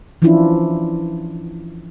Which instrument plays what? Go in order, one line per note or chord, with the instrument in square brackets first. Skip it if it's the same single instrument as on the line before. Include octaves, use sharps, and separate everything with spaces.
[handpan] E3 F3 C#4 D4 E4 F4